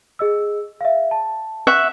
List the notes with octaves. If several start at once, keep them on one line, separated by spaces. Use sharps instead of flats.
G#4 D#5 E6
E5 F5
A5
E5 F#5 C#6